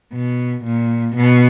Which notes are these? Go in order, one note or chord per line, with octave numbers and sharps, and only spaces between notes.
B2
A#2
B2